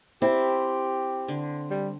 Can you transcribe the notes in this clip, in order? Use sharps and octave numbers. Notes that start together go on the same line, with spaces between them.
C4 E4 G4
D3
G3